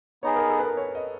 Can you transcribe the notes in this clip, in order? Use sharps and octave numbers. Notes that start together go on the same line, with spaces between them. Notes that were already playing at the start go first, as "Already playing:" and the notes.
B3 D#4 G#4 C#5
A#4
A4
B4
A#4
C#5
D#5